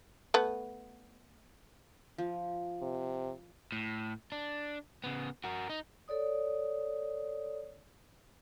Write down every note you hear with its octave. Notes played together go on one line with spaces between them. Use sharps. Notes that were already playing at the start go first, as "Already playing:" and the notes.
A3 B3
F3
C3
A2
D4
C#3 B3
F#4 A#4
D#4
A4 C#5 D5 D#6